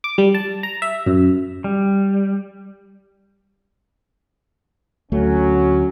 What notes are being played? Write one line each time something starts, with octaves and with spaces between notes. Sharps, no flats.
D6
G3
A5
A#5
E5
F#2
G3
D2 F#3 A3 C#4